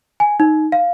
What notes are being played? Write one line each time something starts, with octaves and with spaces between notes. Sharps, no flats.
G#5
D#4
F5